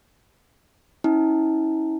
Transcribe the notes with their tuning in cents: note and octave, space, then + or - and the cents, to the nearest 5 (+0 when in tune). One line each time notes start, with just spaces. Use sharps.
C#4 -20 E4 -40 A5 -40